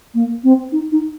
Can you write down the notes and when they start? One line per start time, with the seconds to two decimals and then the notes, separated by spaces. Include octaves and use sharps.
0.14 A#3
0.44 C4
0.72 D#4
0.92 D#4